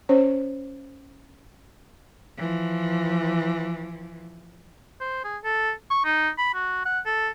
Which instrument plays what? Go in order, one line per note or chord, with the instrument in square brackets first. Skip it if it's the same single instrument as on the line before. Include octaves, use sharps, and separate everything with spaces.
[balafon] C#4 C5 C#5
[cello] E3 F3
[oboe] C5
G#4
A4
C#6
D#4
B5
F#4
F#5
A4